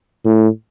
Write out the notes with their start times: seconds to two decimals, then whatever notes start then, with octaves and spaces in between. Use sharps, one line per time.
0.25 A2